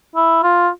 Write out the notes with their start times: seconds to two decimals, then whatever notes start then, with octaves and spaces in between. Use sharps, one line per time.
0.16 E4
0.43 F4